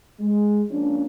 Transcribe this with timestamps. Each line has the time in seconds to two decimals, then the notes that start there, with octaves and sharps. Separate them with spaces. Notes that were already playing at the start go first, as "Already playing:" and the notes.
0.20 G#3
0.71 F3 A#3 C#4 D4